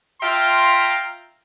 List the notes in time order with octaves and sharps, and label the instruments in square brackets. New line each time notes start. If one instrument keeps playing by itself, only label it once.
[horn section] F4 E5 F5 G5 A#5 C6